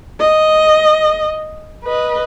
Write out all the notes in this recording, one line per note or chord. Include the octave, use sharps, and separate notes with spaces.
D#5
B4 D#5